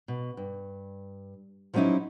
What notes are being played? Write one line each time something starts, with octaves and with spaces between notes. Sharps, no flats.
B2
G2
F3 F#3 B3 C#4 D#4 E4